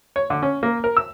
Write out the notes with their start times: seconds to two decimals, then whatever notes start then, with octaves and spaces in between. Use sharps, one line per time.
0.16 C#5
0.30 D3
0.42 C#4
0.63 A#3
0.84 A#4
0.97 E6